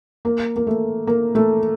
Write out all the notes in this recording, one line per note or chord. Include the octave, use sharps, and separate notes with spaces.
A#3
A#3
A3
A#3
A3